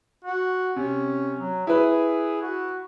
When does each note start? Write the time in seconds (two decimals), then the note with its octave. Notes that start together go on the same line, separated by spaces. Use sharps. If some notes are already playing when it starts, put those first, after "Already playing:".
0.25 F#4
0.76 C3 C#4
1.38 F#3
1.67 E4 G#4 B4
2.42 F#4